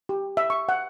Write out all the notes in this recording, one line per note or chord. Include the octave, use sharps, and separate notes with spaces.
G4
E5
C#6
F#5